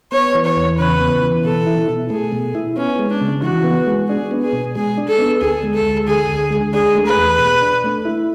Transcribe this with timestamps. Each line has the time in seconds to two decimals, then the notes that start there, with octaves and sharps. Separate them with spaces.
0.12 B3 C#5
0.35 E3
0.45 C#5
0.57 E2
0.78 C#3 B4
1.01 B3
1.22 E3
1.45 B2 A4
1.66 E4
1.89 B2
2.10 A3 G#4
2.32 B2
2.55 E4
2.77 B3 C#4
2.99 G#3
3.10 D4
3.21 C#3
3.42 E3 F#4
3.64 B3
3.87 G#3
4.08 D4 G#4
4.31 B3
4.42 G#4
4.53 B2
4.76 G#3 G#4
4.98 D4
5.08 A4
5.18 B3
5.41 D2 G#4
5.63 G#3
5.74 A4
5.85 D2
6.07 D3 G#4
6.29 D2
6.51 G#3
6.73 D4 G#4
6.95 A3
7.06 B4
7.17 E2
7.39 B2
7.62 D4
7.84 A3
8.05 E4